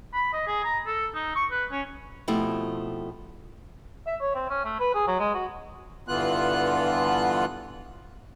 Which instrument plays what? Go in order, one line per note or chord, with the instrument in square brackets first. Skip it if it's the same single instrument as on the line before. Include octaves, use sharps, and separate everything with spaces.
[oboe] B5
D#5
G#4
A#5
A4
D#4
C#6
B4
C#4
[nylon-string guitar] B2 F3 A3 C4 E4 G4
[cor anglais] E5
C#5
C4
C#4
A3
B4
G#4
F#3
G#3
F#4
[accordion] G2 D3 E3 B3 F4 F#6